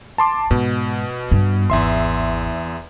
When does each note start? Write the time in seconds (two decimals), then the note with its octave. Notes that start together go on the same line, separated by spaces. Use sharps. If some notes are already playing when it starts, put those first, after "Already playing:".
0.18 A5 C6 D6
0.51 G#2 B2
1.32 G2
1.70 G#1 E2 E5 C6